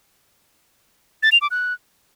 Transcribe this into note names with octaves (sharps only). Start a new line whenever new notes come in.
A6
F7
D6
F#6